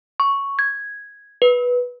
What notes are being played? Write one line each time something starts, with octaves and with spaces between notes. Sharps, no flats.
C#6
G#6
B4